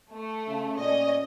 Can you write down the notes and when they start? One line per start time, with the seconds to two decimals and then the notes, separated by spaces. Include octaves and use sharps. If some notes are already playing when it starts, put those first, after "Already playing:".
0.14 A3
0.48 C#3
0.79 A#2 C#4 D5 D#5